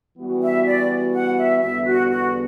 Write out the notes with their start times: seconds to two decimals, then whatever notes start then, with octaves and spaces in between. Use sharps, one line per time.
0.18 E3 G3 B3 F#4
0.42 E5
0.66 D5
1.14 F#5
1.38 E5
1.61 E2 D3 G3 B3 E5
1.85 F#4
2.09 F#4